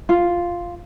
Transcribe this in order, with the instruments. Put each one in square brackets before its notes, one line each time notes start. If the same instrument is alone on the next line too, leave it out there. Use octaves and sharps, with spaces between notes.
[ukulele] F4